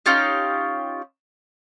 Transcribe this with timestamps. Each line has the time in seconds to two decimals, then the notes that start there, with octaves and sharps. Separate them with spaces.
0.06 C#4 D#4 F4 G4